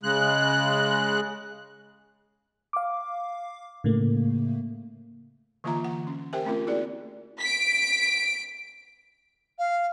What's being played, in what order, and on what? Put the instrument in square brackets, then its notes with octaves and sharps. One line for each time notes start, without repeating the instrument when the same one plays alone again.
[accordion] C#3 G#3 F#6
[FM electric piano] F5 D6
A2 C#3 A3 A#3
[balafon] D3 E3 A#3 F4 E5 A#5
F#5
C#4
G4 A#4 C5 E5 G5 G#5
A3 C4 C#4 F4 A#4
A#3 E4 F#4 G#4 D5
[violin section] B6 D7
[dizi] F5